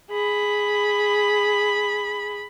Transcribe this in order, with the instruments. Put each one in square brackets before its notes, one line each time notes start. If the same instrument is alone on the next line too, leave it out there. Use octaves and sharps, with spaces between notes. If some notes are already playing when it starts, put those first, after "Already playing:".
[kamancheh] G#4 B5